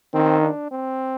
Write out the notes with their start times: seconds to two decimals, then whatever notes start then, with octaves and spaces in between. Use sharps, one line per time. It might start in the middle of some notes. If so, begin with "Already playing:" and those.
0.14 D#3 C4
0.42 D4
0.72 C4